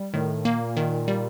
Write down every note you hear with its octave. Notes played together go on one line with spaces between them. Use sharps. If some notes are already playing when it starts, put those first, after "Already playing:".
Already playing: G3
A2 D#3
A#2 A#3
D#3
G3